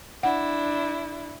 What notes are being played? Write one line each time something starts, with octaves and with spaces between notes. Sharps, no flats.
D4 E4 F#5